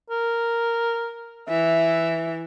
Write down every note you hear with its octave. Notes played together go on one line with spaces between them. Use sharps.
A#4
E3 E5